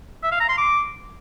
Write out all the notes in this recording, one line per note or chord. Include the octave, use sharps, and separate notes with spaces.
E5
F5
A#5
C6
D6